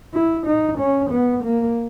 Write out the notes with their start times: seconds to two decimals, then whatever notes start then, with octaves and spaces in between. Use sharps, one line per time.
0.14 E4
0.46 D#4
0.79 C#4
1.11 B3
1.44 A#3